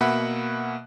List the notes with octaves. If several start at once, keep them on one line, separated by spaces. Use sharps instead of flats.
B2 A#3 E5 F#5 B5 F#6